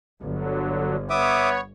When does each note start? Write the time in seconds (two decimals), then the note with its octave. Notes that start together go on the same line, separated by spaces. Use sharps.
0.23 G1 D3 F#3
1.10 B3 C#5 E5 D6 D#6